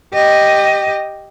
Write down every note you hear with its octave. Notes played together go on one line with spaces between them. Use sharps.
G4 D#5